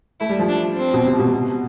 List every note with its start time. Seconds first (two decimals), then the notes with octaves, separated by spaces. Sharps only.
0.21 A3 E4
0.29 G3
0.39 F3
0.49 D4
0.77 C4
0.94 B2
1.05 C3
1.19 B2
1.27 C3
1.33 B2